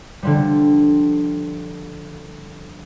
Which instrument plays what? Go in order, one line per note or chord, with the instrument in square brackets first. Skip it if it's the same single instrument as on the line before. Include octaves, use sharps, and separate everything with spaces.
[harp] D3 F3 G3